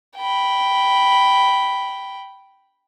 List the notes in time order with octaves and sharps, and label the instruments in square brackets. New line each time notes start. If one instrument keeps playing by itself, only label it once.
[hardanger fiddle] G5 B5